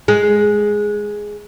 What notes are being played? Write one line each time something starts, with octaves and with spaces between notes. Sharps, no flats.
G#3